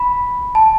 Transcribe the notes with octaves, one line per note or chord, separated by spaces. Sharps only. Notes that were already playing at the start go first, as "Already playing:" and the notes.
Already playing: B5
A5